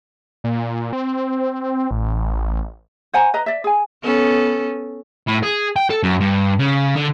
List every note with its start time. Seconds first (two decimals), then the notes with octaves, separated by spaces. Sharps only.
0.44 A#2
0.93 C4
1.91 A1
3.13 C5 F#5 G#5 A#5
3.34 B4 D#5 A#5
3.46 D5 E5
3.64 G#4 G#5
4.03 B3 C#4 A4
5.27 A2
5.43 G#4
5.76 G5
5.90 A4
6.03 F#2
6.20 G2
6.59 C#3
6.96 D3